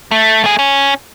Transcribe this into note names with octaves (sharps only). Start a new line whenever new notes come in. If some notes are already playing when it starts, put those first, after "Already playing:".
A3
A3 G#4
C#4